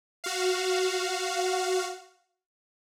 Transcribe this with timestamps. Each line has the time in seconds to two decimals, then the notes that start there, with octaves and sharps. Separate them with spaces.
0.24 F#4 F5